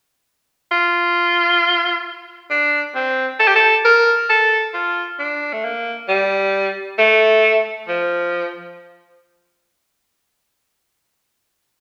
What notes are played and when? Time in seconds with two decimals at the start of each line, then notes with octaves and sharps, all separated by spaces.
0.72 F4
2.50 D4
2.95 C4
3.40 A4
3.48 G4
3.56 A4
3.85 A#4
4.30 A4
4.74 F4
5.19 D4
5.53 A3
5.64 A#3
6.08 G3
6.99 A3
7.88 F3